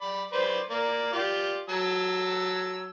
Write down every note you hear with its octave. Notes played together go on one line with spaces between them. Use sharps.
D5 B5
B4 C5 D5
A#3 D5
F4 G4 D5
F#3 A5 E6